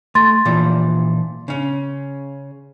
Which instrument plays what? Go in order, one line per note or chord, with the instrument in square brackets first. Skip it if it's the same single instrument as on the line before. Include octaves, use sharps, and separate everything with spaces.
[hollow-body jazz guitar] A3 [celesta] C6 A6
[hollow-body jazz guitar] A#2 E3 F3
C#3 C#4